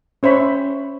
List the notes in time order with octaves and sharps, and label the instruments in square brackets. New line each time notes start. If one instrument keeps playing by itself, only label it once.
[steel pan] C#4 C5 E5 B5 C#6